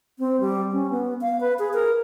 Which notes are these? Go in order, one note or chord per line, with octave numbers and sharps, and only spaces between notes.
C4
G3
C#4
B3
F5
B4
G#4
A#4